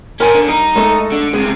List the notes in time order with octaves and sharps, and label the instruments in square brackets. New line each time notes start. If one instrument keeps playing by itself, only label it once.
[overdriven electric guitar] C#4 C5 [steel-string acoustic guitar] A#4 G#5
[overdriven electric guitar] D3
[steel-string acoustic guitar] G3 [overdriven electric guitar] D#4
[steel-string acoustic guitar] G#3 A3 A4
[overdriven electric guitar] D3
[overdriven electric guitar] C#2 C3 [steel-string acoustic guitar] G#4